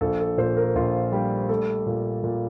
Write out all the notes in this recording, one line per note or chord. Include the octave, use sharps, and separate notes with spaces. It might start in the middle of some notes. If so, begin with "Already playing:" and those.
A#1 A4
A4
A#2 C5
A#4
A#1 F4
G3 G4
A3 A4
A#2
A#2